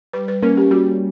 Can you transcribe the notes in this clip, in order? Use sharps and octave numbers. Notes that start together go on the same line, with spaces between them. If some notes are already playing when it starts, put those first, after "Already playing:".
G3 B4
B4
A#3 C#4 A#4
G4
G3 F#4